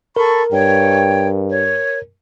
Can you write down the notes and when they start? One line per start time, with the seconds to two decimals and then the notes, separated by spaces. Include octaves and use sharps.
0.16 A4 A#4 B5 C#6
0.52 G2 C#5 G5
1.49 C#5